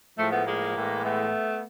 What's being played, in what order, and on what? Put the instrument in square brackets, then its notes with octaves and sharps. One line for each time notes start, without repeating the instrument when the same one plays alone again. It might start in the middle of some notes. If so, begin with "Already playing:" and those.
[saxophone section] A2 F3 G#3 A3
A3 B3
G#3 A#3
A2 E3 G#3
A3 B3